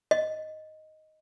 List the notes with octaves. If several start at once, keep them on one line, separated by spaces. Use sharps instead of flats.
D#5